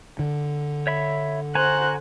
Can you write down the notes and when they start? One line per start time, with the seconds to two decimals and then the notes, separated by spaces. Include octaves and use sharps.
0.19 D3
0.87 C#5 E5 B5
1.55 F#4 C5 G#5 A#5 F#6